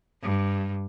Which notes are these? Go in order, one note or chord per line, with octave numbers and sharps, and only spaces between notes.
G2